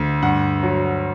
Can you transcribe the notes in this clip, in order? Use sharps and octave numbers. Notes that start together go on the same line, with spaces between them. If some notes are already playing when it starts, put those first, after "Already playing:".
Already playing: D2
G2 F#5
F#3